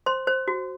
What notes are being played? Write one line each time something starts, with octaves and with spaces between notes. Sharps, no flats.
C5 C6
C5
F#4